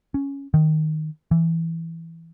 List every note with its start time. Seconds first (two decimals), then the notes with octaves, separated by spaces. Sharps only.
0.14 C#4
0.54 D#3
1.31 E3